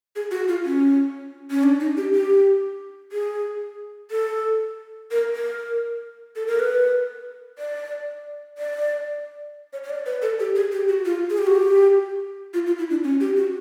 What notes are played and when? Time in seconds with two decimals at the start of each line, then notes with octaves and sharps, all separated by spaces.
0.16 G#4
0.31 F#4
0.48 F4
0.65 C#4
1.51 C#4
1.63 D4
1.80 D#4
1.97 G4
2.14 G4
3.12 G#4
4.11 A4
5.11 A#4
5.35 A#4
6.36 A4
6.47 A#4
6.59 B4
7.58 D5
8.58 D5
9.73 C#5
9.84 C#5
9.90 D5
10.06 B4
10.22 A4
10.40 G4
10.56 G#4
10.72 G4
10.89 F#4
11.05 F4
11.30 G#4
11.38 G4
11.47 F#4
11.56 G4
12.54 F4
12.67 F4
12.78 E4
12.90 D4
13.04 C#4
13.20 G4
13.37 F#4